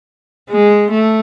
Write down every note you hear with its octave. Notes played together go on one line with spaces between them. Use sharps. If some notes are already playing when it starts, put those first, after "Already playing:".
G#3
A3